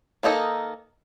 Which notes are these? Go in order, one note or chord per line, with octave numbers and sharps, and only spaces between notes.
D#3 A#3 D#4 A4 D#5